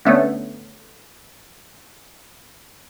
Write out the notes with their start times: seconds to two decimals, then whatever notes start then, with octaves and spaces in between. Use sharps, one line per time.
0.05 D3 A3 B3 C#4